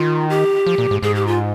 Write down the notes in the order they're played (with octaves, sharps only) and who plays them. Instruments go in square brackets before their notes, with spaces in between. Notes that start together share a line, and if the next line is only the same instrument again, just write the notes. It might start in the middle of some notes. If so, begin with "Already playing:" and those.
Already playing: [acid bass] D#3 [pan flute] F4
[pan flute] G4
[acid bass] F3
A#2
G#2
[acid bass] G#2 [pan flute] G#4
[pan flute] G4
F4